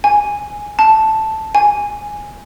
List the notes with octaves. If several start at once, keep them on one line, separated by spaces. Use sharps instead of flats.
G#5
A5
G#5